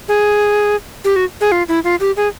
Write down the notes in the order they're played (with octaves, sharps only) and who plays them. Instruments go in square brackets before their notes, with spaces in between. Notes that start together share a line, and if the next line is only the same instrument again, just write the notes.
[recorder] G#4
G4
F#4
G#4
F4
E4
F4
G4
G#4